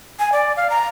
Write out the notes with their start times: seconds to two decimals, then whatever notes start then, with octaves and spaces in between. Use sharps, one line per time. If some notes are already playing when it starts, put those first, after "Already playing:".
0.19 G#5
0.32 D5
0.57 F5
0.70 A#5